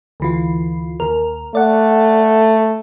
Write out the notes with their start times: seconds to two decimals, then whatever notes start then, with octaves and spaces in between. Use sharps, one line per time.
0.20 D2 E3 F4
1.00 D#2 A#4
1.55 A3 D5 F#5